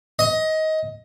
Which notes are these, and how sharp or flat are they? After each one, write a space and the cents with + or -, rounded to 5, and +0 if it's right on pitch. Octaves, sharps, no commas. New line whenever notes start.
D#5 +20